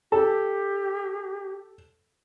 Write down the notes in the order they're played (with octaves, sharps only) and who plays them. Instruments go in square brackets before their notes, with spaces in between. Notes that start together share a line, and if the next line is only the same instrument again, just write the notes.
[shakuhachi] G4 [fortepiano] A4